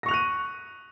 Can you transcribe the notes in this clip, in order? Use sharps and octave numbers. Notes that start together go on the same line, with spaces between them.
C#6 F#6 A#6 D#7 F7